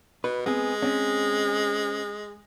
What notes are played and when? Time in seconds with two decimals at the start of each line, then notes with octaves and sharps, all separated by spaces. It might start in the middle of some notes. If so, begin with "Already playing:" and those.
0.24 B2 B4
0.46 G#3 B3 C4 G#4
0.82 C4 C#4